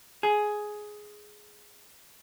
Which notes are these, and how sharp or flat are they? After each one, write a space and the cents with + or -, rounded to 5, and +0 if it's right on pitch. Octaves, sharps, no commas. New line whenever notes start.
G#4 +10